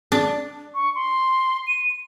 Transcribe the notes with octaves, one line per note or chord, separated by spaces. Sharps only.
D4
C#6
C6
D#7